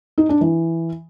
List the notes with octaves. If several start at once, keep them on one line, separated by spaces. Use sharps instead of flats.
D#4
D4
E3